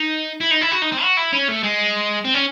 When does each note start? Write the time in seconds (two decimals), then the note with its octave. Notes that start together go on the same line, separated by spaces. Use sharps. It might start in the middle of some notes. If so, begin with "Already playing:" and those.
Already playing: D#4
0.41 E4
0.51 D#4
0.62 E4
0.72 F#4
0.82 D#4
0.92 C4
1.02 F#4
1.17 E4
1.33 C#4
1.49 A3
1.64 G#3
2.25 C4
2.34 C#4